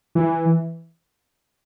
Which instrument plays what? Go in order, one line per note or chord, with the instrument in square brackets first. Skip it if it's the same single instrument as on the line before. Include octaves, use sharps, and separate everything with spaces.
[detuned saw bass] E3